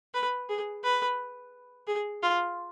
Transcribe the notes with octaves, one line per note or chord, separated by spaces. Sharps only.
B4
G#4
B4
G#4
F4